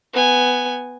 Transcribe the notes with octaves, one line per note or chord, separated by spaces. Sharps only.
B3 G#5